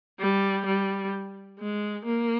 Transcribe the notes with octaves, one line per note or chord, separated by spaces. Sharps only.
G3
G3
G#3
A#3